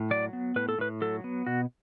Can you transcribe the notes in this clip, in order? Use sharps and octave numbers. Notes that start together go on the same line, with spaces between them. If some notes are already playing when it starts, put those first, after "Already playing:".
Already playing: A2
F#3 D5
B3
A2 B4
A4
A2 B4
F#3 A4
B3
B2 F#4